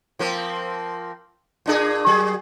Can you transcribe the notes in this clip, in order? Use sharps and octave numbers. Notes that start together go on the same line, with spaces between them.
F3 A#3 C4
A#2 D4 G#4
F#3 G#4